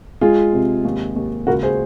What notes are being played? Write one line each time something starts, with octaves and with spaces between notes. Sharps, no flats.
G#3 F4 G#4
C3
D#2
D#2
C#2 F#4 A#4
G#4 C5